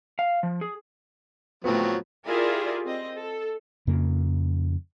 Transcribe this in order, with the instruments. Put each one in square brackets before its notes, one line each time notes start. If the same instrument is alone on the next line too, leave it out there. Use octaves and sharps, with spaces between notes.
[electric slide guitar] F5
F3
G#4
[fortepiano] A2 B3 [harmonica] F3 F#3 C4
[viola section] E4 F4 G4 G#4 A#4 D5
C4 D#5
A4
[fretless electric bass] F2 C#3 A#3